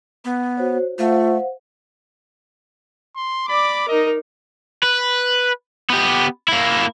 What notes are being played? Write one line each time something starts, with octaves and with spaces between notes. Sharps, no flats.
B3
F#4 C5 C#5
A3 F4 C5 F5 F#5
C6
D5 B5 D6
D#4 A#4 D#5
B4
B3 G4
A#3 E4